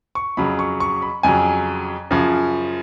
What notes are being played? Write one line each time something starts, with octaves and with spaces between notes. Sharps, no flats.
C#6
F2 C#3 F#3 B5
C#6
C#6
B5
F2 C#3 F#3 G#5
F#2 C#3 F3